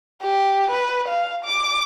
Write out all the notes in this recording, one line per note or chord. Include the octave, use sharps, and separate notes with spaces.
G4
B4
F5
D6